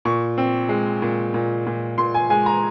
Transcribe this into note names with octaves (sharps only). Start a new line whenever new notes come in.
A#2 C#6
C4
G#3
A#2
A#2
A#2
A#2 C6
G#5
G#3 G#5
A#5